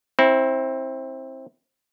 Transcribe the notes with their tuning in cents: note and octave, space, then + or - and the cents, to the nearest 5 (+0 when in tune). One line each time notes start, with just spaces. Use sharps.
C4 +20 E4 -15